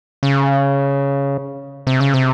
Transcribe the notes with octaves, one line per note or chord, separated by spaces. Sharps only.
C#3
C3
C#3
C3